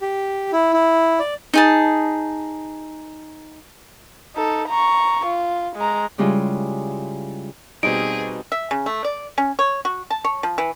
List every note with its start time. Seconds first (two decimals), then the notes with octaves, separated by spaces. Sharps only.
0.01 G4
0.53 E4
0.73 E4
1.20 D5
1.54 D#4 G#4 A5
4.35 D#4 A4
4.69 A#5 C#6
5.26 F4
5.76 G#3 A#5
6.18 C#3 G3 G#3 E4 F4 G#4
7.83 B2 G3 C4 D#4 G#4 D7
8.52 E5
8.71 C#3
8.86 A3
9.04 D5
9.38 C#4
9.59 C#5
9.85 F#4
10.10 A5
10.24 C#5
10.43 F3
10.58 E3